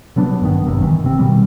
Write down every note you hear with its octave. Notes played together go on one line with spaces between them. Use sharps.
C3 F#3 B3 D4
G2 D#3 B3
G1 G2 C3
D#3 E3
C3 C4
B2 D#3 G3